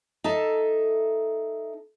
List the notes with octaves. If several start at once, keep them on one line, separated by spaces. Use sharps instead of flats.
D#4 A4 E5 A5